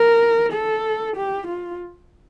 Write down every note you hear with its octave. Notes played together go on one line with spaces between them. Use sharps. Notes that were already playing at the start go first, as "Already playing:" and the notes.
Already playing: A#4
A4
G4
F4